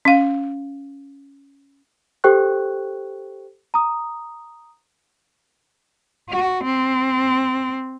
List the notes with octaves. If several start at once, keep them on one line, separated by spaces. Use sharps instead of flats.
C#4 F5
G4 A4 C5 G5 C#6 F#6
A#5 D#6
F#4
C4